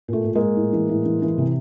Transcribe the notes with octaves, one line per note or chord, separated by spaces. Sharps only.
A#2 A3
A#2
G#3 A#3
A#2
A2
E3
A2
E3
E3
C3